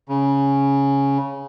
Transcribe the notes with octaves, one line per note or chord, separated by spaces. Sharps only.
C#3